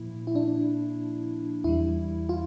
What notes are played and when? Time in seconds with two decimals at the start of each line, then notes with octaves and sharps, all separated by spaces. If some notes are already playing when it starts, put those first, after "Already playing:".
Already playing: A#2 F3 A#3 E4
0.27 E4
0.35 D4
1.64 E2 E3 G3 E4
2.29 F4